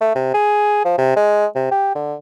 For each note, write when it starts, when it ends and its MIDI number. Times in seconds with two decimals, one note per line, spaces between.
0.01 0.12 57
0.15 0.29 48
0.34 0.83 68
0.85 0.93 53
0.98 1.14 48
1.16 1.46 56
1.55 1.71 48
1.71 1.91 67
1.95 2.15 50